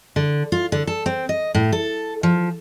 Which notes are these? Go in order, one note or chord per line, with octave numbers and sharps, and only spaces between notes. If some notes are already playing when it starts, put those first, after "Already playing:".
D3
F4
D3
A4
C4
D#5
A2
A4
F3